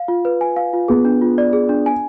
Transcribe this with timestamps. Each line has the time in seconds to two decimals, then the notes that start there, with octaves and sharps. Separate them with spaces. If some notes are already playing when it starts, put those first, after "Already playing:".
Already playing: F5
0.08 F4
0.25 B4
0.41 G#5
0.56 F5
0.73 F4
0.88 B3 G#4
1.05 D4
1.21 F4
1.38 D5
1.53 G#4
1.69 D4
1.86 G#5